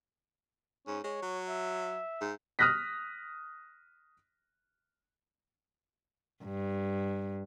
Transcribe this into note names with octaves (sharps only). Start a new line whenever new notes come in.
G#2 C#4
G#3 C#5
F#3
E5
G#2
D#6 F6 F#6 A#6 B6
G2